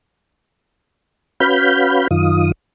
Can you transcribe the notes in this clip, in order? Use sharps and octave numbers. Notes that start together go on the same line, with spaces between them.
C#4 F#4 B4 F5 B5 G6
F#2 D#3 F4 D#6